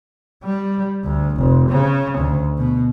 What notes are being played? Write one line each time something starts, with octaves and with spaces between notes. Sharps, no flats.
G3
D2
F1
C#3
D2
B2